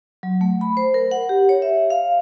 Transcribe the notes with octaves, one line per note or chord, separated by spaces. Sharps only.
F#3
A3
B5
C5
A#4
F#5
G4
C#5
E5
F5